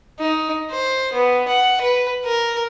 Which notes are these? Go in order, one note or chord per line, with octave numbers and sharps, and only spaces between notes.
D#4
C5
B3
F#5
B4
A#4